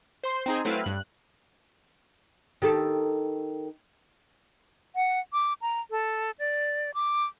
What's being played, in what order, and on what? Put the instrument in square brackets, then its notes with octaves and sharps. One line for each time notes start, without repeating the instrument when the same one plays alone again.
[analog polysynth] C5 C6
C4 D#4 G#4
F#3 A3 C4 E4 B4 F5
G2 F#6
[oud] D#3 G4 A4
[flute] F#5
D6
A#5
A4
D5
D6